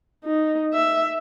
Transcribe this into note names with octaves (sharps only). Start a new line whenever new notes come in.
D#4
E5